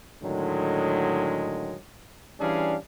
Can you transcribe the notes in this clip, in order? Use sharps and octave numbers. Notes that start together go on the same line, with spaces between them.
A2 D3 D#3 F#3 G#3
E3 G3 C#4 D4 G#4 F5